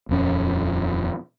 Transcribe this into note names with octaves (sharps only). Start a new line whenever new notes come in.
D#1 F2 C#4